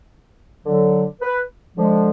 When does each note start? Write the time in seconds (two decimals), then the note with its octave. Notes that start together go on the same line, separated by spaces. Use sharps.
0.66 D3 F#3
1.22 B4
1.76 D3 F3 G#3